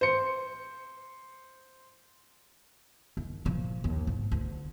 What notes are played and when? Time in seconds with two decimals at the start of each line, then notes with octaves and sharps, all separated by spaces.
0.01 C5 C#7
3.17 D#2
3.45 A#2 F3
3.84 D#2
4.07 G#2
4.32 D2